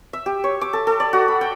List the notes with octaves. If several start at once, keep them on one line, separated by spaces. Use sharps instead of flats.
E5
G4
C#5
D6
A4
A4
D5
F#4
B5
G5